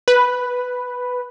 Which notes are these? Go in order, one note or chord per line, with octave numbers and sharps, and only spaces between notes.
B4